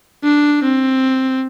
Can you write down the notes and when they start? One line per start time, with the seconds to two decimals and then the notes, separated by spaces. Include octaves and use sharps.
0.24 D4
0.63 C4